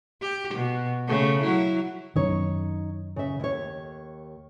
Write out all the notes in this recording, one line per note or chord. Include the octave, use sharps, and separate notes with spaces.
G4
B2
C#3 A3
F#3 E4
F#2 D#3 D#4 C#5
C#3 E5
D#2 C#5